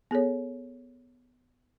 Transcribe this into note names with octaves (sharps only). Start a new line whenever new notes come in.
B3 G#4 A4 C#5